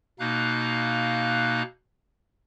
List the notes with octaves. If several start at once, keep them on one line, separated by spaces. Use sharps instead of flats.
B2 A#3 D#4 F5 F#6